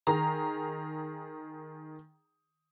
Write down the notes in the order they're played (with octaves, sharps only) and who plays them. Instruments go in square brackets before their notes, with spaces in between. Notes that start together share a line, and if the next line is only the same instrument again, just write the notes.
[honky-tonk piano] D#3 G#4 A#5